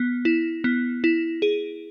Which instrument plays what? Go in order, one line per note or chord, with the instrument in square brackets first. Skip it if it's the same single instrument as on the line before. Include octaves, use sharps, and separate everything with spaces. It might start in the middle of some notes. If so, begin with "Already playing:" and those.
Already playing: [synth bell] B3
E4
B3
E4
G#4